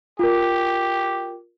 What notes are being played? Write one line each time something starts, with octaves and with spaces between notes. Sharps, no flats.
F4 G4 A#4